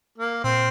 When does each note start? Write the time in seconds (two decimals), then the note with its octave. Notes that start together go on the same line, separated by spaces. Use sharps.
0.18 A#3
0.44 A#2 C4